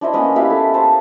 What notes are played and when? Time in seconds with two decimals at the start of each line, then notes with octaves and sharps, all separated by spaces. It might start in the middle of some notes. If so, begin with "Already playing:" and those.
0.01 D4 E4 C5 D#5
0.13 A#3 B3 C#4 D#6
0.36 E4 G4 B4 F5
0.50 A4
0.74 C5 A5
0.85 A#5